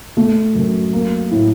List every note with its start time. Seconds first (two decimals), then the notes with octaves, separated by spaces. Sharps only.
0.17 A3
0.55 F#2
0.93 A#3
1.31 A2